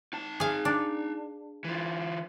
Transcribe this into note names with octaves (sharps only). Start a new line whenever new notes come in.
D#4 A5
G#4 F5
D4
E3 F4